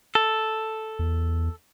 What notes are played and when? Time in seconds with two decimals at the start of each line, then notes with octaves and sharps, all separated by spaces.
0.15 A4
0.99 E2